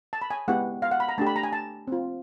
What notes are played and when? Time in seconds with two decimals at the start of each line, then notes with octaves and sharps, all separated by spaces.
0.13 A5
0.22 B5
0.31 G#5
0.48 G#3 B3 E4 G4 F#5
0.82 F5
0.91 F#5
1.00 B5
1.08 A#5
1.18 A3 D4 G4 A5
1.27 B5
1.36 A#5
1.43 G#5
1.53 A5
1.88 C4 F4